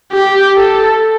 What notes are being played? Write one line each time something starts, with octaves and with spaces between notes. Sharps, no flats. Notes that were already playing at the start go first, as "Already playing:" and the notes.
G4
A4